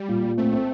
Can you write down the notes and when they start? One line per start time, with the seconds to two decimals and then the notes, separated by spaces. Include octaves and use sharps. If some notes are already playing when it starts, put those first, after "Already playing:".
Already playing: G3
0.09 A#2
0.23 A#2
0.38 A3 C4
0.53 C4